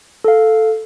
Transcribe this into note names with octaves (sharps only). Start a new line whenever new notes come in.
A4 F5